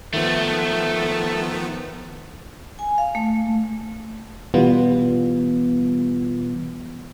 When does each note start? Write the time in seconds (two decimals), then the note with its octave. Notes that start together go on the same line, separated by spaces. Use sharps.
0.14 D#3 F3 A3 B3
2.79 G#5
2.98 F5
3.15 A3
4.54 B2 E3 G3 B3 F4